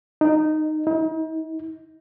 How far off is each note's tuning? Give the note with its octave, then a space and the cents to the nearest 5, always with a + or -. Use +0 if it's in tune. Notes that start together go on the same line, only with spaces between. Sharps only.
D#4 -10
D#4 +40